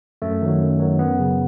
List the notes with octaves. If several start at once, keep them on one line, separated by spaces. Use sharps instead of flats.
F#2 A3
D#3 F#3
F#2
D#3 F#3
F#2 B3
C#3 F#3